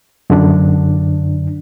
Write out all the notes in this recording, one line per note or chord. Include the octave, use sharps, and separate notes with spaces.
F#2 D3 D4